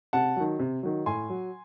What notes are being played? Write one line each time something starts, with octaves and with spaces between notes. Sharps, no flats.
C3 F#5 A5
D#3 F#3
C3
D#3 F#3
A2 G#5 C6
F#3